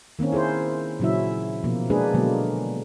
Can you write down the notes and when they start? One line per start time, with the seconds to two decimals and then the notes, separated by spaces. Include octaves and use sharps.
0.19 D#3 A#3 C4 C#4
0.32 E4 G#4 A#4 C5
1.00 A#2 C#3 F#3 C#4 E4 E5
1.64 B2 F3 A#3
1.90 G#3 A#3 D4 G#4 B4
2.14 B2 D3 F#3 G#3 A#3